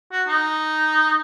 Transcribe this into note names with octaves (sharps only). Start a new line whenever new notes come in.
F#4
D#4